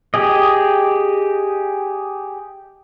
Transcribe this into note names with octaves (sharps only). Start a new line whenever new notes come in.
G4 G#4 D#5